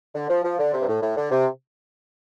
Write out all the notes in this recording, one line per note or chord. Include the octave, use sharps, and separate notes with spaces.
D3
F3
F3
D3
C3
G2
A2
A2
D3
C3